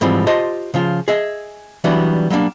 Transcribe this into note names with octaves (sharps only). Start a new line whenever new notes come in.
G#2 E3 F3 G3 C4
F4 G4 C5 D#5 A5
C#3 F3 F4
G#4 D#5 E5
E3 F#3 G3 B3 D4 F#4
F#3 G3 A#3 D4